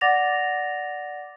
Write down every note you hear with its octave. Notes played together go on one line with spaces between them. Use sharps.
D5 F#5 D6 A6 A#6 F7